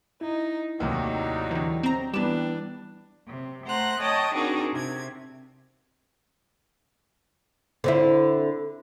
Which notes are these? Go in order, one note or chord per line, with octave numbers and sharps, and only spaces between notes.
D#4 E4
D#2 A2 C3 F#3 G3 D#4
D3 E3
C4 A#5
E3 G3 B3 D4 G4 B4 E7
C3
A3 C5 F#5 A#5 C6 F#6
C#5 D#5 G5 A5 C#6 D#6
C4 D4 D#4 F#4 G#4 A#4
C3 G#6
D3 C4 E4